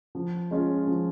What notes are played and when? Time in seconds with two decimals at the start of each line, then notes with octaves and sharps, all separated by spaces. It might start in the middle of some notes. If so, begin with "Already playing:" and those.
0.15 F3
0.51 G#3 C#4 F4
0.87 F3